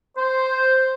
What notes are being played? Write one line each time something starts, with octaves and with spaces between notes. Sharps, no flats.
C5